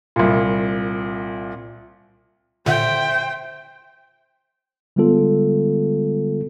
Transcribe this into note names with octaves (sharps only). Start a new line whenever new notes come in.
C2 A#2
A#2 D3 C5 E5 G5
D3 G3 G#3 B3 F4 A4